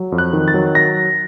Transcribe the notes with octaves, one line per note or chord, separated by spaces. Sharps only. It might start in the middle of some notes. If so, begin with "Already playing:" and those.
Already playing: F#3
F2
F#6
D#3
A6
F#3
A#6